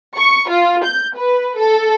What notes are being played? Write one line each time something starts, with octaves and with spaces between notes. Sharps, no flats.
C#6
F4
G6
B4
A4